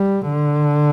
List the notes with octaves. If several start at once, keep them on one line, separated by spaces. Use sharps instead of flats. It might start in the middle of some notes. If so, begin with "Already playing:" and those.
Already playing: G3
D3